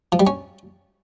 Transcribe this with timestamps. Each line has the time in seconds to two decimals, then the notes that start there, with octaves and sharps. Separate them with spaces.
0.12 F3
0.20 G3
0.27 C#4